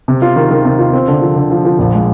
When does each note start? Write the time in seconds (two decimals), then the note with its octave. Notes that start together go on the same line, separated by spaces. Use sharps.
0.08 C3
0.22 F4
0.36 D#3
0.51 D#3
0.65 C3
0.79 F4
0.93 C4
1.08 D3
1.22 F3
1.36 D3
1.51 F3
1.65 F3
1.79 A#1
1.93 G#3